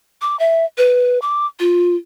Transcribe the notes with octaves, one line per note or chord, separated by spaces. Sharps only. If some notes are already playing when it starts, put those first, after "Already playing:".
D6
E5
B4
D6
F4